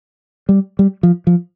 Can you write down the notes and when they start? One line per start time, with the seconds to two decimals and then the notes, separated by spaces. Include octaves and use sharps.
0.49 G3
0.79 G3
1.03 F3
1.27 F3